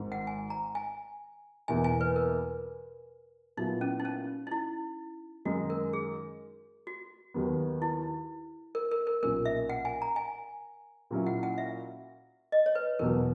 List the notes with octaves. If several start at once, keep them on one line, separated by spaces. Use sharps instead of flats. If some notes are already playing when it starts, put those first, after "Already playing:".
Already playing: G#1 G#2 D#3
F#5
G#5
A#5
G#5
E2 B2 A#3 E4 G#5
G#5
B4
A#4
A#2 F#3 B3 D#4 E4
C#4
D#4
C#4
D#4
E4
F#2 D#3 G#3 D#4 F#4
A#4
G#4
F#4
D#2 D#3 F#3 B3
E4
A#4
A#4
A#4
B1 A#2 A#3 C#4 A#4
E5
F#5
G#5
A#5
G#5
A#2 F#3 C#4 E4
F#5
F#5
E5
D#5
C#5
B4
E2 B2 F#3 A#4